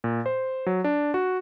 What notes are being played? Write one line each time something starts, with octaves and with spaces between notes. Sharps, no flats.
A#2
C5
F#3
D4
F#4